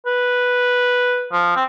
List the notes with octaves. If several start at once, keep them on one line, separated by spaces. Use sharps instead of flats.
B4
F3
C4